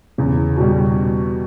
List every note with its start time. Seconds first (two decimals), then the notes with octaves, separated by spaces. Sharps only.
0.18 E2 C#3
0.56 B2 G3